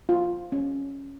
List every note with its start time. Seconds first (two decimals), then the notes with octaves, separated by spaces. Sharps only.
0.09 F4
0.52 C#4